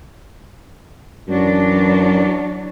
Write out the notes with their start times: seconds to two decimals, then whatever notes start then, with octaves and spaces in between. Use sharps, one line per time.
1.28 F#2 E3 F#3 D4